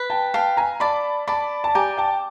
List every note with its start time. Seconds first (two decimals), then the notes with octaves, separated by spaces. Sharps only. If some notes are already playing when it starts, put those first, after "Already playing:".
Already playing: B4
0.10 G5 A5
0.34 F5 G5 A5
0.57 G#5 A#5
0.80 D5 A5 B5
1.28 D5 A5 B5
1.64 A5
1.75 G4 G#5 A#5
1.97 G5 A5